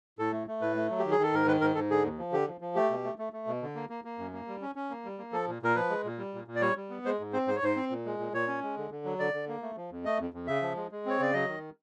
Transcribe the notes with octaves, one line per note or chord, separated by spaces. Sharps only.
A2 A4
A3
A3
A2 B4
A3
F#3
G4
D#3
G#4
D#3 A4
G#2 A#4
D#3 B4
G#2 A#4
G#2 A4
D3 G#4
D#2
F3
D3 G4
F3
F3
A3 G4
B2
A3
A3
A3
B2
D3
A#3
A#3
A#3
F#2
A#3
G3
C#4
C#4
A#3
G3
A#3
F3 A4
A#2
A#2 A#4
F3 B4
G#3
A#2
G3
A#2
A#2
D5
G3 C#5
G3
B3
G#3 C5
G#2
C4 C5
G#2 C5
C#5
G#2 C5
C4
A#2
G#3
A#2
A#2 C#5
C#4
G#3
D3
D3
F#3
D3 D5
D3
A#3
A3
F3
F2
A3 D#5
F2
F2
C#3 E5
F3
G#3
G#3
C4 C#5
C#3 D5
F#3 D#5
D#3